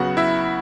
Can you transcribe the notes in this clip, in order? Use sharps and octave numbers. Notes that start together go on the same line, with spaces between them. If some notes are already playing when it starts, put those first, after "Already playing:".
Already playing: C#3 F#3 B3 F#4 F#5
E4 E5